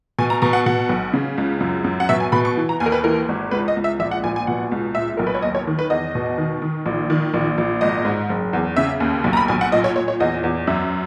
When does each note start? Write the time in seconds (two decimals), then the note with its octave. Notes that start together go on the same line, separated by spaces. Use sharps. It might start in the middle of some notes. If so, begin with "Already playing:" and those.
0.19 B2 G#5
0.30 A#5
0.42 B2 A#5
0.53 F#5
0.66 B2 F#5
0.89 B1
1.13 C#3
1.38 C#2
1.61 F#2
1.84 F#2
2.00 F#5
2.09 B2 E5
2.20 G#5
2.32 B2 B5
2.45 C#6
2.57 E3
2.69 A#5
2.80 D#2 G#5
2.86 A#4
2.92 B4
3.04 E3 A#4
3.29 G#1
3.51 C#2 B4
3.68 D#5
3.77 C#2
3.84 E5
3.99 A#1 E5
4.11 F#5
4.24 A#1 G#5
4.36 G#5
4.47 B2 F#5
4.72 C#2
4.95 A#2 E5
5.17 B1 A#4
5.27 B4
5.35 C#5
5.42 D#2 D#5
5.55 C#5
5.67 D#3
5.79 B4
5.90 E2 D#5
6.15 B2
6.38 D#3
6.62 D#3
6.86 A#1
7.10 D#3
7.34 A#1
7.58 A#1
7.81 G#1 D#5
8.05 G#2
8.29 F#1
8.53 E2
8.76 C#3 E5
9.00 D#2
9.24 B1
9.33 A#5
9.37 B5
9.48 B1 G#5
9.61 F#5
9.72 A#2 D#5
9.84 C#5
9.96 A#2 C#5
10.08 C#5
10.20 E2 D#5
10.44 E2
10.67 F#2 E5